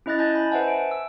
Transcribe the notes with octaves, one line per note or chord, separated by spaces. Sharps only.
C#4 E4 D#5 F#6 A6 A#6
D#5 G#5 A5 F#6 G6 A6
B5
B4 C5 E5 F#5 G#5 A5
D7
E6